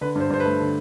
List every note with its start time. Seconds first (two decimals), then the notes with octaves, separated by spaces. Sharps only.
0.01 D3 B4
0.15 G2 C5
0.30 G2 C5
0.40 B4
0.46 A3
0.60 D3